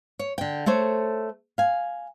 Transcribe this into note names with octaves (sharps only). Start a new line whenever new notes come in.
C#5
D3 G5
A3 A4 C5 C#5
F5 G#5